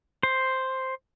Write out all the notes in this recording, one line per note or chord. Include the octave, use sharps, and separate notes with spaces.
C5